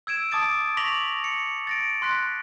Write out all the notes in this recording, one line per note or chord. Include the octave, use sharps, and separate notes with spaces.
E6 G#6 D7 E7
A5 D6 D#6 A6 D7
C#6 D6 A#6 B6 F7 F#7
C#7
A6 A#6 D7
C6 F#6 B6